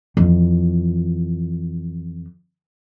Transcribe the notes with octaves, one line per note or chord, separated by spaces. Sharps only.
F2 E3